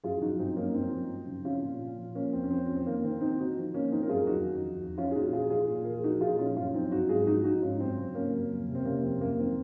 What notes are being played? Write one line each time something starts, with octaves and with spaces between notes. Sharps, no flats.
F#2 F4 G#4
F3 D#4 F#4
F#2 C4 D#4
F#2 A#3 C#4
F#2 C4 D#4
F3
F#2
C#3
F3 C#4 F4
A#2
A#2
F3
F3 A#3 C#4
F2 C4
C#4
F3 C4
F2 C#4
C4
D#3 A#3
D#3 C4
D#3 C4 D#4
D#3 D#4 F#4
F3
F3 A#3 C#4
F3 C4 D#4
A#4
F#2 F4 G#4
F2 D#4 F#4
D#3
F2
F2
F3 C#4 F4
G#4
A#2 D#4 F#4
F3 F4 G#4
F3 F4 G#4
A#2
F3 A#4
G#4
F3 D#4 F#4
A#2 F4 G#4
F3 C#4 F4
F#2 C#4 F4
F3 C4 D#4
F#2 D#4 F#4
G#2 F4 G#4
F3 D#4 F#4
F3 D#4 F#4
G#2 C#4 F4
F#2 C4
C#3 C4
C#3 A#3 C#4
F#2
F2
C3
C4
C3 A#3 C#4
F2 C4
F#2 A#3
D#3 C4